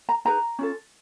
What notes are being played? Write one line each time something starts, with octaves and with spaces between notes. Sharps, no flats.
A#5
D#4 G#4 B4 A#5
C#4 F4 A4